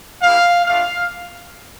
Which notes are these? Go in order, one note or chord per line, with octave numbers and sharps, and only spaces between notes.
A#3 E4 G4 F5
A3 D4 F4 F5